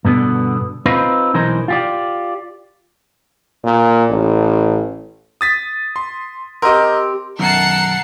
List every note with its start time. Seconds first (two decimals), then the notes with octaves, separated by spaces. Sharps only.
0.05 G2 B2 D3 B3
0.86 C4 D#4 F4 B4
1.34 B1 E3 D#4 A#4 C5
1.68 F4 G4 D5
3.64 A#2
4.09 A1
5.41 D#6 A6 B6
5.96 C6
6.62 C4 G4 A#4 D#5
7.39 B1 F#2 D#3 A#4 F#5 A5 C7 C#7